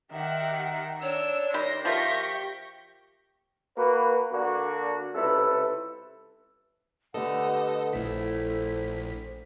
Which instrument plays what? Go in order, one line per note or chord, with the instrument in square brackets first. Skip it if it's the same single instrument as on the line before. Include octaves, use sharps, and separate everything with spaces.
[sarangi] D#3 [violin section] G4 E5 F#5
[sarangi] D4 [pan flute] C#5 [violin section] E6
[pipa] D#3 G3 [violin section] C6 A#6
[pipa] F3 F4 A#4 [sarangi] G4 [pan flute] E5 [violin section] C#6 G6 A#6
[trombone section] A#3 F#4 B4
D3 A#3 D4 F#4
C#2 C3 E4 A4 B4
[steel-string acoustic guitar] D3 A3 B3 [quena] G4 [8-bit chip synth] A4 D#5 [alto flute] F#5
[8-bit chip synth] A#1 B6 [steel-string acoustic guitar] A3 [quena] E4 [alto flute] C5